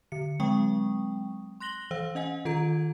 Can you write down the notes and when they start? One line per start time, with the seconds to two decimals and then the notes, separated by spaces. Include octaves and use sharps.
0.12 D3 C#7
0.40 F#3 G#3 C4 G5 C#6 D#6
1.60 C6 F#6 A#6 F#7 G7
1.91 E3 C5 F5 E6
2.15 C#4 D#5 F#5 G#5
2.45 D#3 F4 A4 A#5 G#6 D7